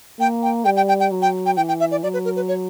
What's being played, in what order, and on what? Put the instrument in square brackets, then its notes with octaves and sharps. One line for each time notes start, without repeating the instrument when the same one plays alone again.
[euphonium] A#3 [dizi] G5
[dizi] G5
[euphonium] G3 [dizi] G5
[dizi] G5
G5
G5
[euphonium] F#3
[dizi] G5
G5
[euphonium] E3 [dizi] G5
[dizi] G5
E5
D5
[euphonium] F#3 [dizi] D5
[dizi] B4
A#4
B4
C#5